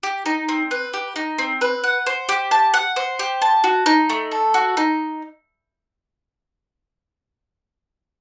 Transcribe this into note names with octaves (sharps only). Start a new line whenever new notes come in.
G4
D#4
C4
B4
G4
D#4
C4
B4
F#5
C5
G4
A5
F#5
C5
G4
A5
F#4
D#4
A3
A4
F#4
D#4